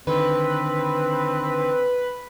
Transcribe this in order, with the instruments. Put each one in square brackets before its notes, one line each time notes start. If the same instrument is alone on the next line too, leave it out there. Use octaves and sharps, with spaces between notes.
[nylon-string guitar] D3 D#3 [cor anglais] C4 [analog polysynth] B4